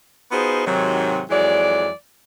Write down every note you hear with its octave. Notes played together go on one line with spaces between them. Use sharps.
B3 D#4 F4 F#4 G#4 C5
G#2 C3 D#3 F#3
F2 E3 F#3 G#3 D5